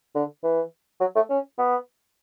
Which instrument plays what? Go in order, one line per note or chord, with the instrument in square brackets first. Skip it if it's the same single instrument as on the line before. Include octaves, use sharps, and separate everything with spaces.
[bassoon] D3
E3
F#3
A3
C#4
B3